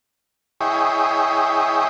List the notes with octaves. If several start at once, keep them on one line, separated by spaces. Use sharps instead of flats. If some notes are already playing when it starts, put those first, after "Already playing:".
E4 G#4 C#5 D#5 G5